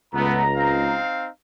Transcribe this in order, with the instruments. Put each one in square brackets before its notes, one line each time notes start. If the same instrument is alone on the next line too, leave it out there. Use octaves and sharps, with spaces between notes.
[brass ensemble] C#2 A#5 [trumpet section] A3 B3
[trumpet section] C4 D#4 F5